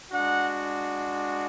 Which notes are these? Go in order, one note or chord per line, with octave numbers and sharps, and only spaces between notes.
G#3 D4 F#4 F#5